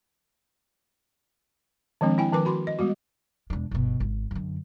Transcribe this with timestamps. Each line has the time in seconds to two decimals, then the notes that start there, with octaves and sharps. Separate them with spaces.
2.01 D#3 F3 G#3 C4 D4
2.18 E4 G5 G#5
2.32 D#3 F3 B4 G#5 D6
2.45 F#4 B5 C6
2.67 D#5
2.79 G3 G#3 B3 F#4
3.50 E1 D4
3.71 G1 B2
4.00 G#1
4.31 F#2 D3